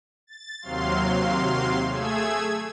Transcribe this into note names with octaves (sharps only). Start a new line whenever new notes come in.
A6
D#2 C3 F#3 F5 C6
A3 G#4 E6 G#6